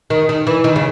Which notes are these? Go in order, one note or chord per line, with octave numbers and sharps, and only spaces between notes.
D#3
D#3
E3
D#3
C#3